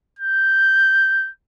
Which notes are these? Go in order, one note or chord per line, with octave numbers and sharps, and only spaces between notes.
G6